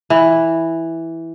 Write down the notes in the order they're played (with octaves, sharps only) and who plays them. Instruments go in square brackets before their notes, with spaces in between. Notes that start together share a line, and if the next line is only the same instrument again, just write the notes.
[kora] E3